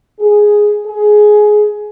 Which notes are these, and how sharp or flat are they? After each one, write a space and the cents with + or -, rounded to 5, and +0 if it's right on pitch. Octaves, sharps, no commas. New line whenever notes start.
G#4 +0
G#4 +15